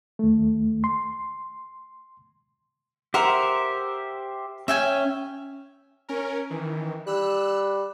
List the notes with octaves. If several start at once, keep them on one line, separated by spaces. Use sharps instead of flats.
D#2 A3
C6
G4 A#4 C5 E5 F#5
C#4 E5 G5 G#5
C#4 A#4
D#3 E3
G3 E6 F#6